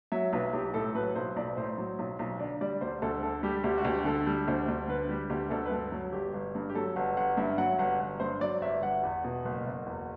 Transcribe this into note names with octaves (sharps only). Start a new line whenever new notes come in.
F#3 E5
B1 B4
B1 G4
A2 A4
F#3 B4
B1 C5
B1 D5
A2 C5
F#3
B1
B1
D3 D5
G3 D5
D2 C5
D2 A4
D3 A4
G3 G4
D2 G4
F#4
D2 G4
D3 A4
G3
D2 C5
D2
D3 B4
G3 G4
D2 G4
D2 A4
B4
G2 A4
F#3
G1 G4
G1
G2
G4
F#3 A4
G1 F#5
G1 F#5
G2 E5
F#3 F#5
G1 F#5
G1
G2 C5
F#3 D5
G1 E5
G1 F#5
E2
B2
F#1
F#1
E2